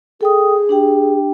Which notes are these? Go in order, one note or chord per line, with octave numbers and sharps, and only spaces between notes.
G#4 A4 G5 D#6
D4 G4 G5